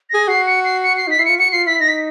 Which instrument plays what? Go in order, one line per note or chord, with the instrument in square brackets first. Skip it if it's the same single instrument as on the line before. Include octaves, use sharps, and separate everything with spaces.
[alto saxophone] G#4 [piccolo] A#6
[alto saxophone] F#4 [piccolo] C7
[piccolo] C#7
C7
C#7
C7
[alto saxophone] D#4 [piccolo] B6
[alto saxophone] E4 [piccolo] C7
[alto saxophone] F4 [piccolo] C#7
[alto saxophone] F#4 [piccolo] C#7
[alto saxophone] F4 [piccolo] C7
[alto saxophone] E4 [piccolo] B6
[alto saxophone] D#4 [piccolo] A#6
[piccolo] B6